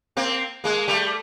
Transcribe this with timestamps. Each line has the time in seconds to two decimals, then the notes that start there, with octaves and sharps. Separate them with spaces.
0.17 A#3 C4
0.64 G#3 A#3
0.88 G3 A3